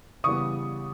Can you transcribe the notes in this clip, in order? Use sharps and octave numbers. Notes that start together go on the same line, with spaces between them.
C#3 E3 G3 B3 C#6 D#6